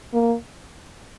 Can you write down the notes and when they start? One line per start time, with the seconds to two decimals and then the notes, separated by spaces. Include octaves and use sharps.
0.13 A#3